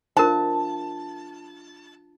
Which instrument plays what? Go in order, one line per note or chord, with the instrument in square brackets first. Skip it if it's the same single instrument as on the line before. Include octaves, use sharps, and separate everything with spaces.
[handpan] D4 F4 [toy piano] A#4 C5 [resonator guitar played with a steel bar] A5